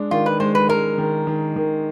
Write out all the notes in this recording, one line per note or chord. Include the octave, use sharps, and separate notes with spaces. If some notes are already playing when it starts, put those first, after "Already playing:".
Already playing: G#3 D4
D#3 F4
B4
G#3 C5
B4
G#3 A#4
D#3
D#3
D#3